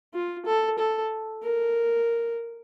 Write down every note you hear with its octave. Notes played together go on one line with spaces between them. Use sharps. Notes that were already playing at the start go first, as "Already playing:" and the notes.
F4
A4
A4
A#4